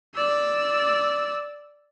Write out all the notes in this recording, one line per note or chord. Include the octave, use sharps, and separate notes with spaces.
D5 E6